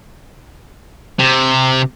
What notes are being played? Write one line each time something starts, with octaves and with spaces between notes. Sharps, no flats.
C3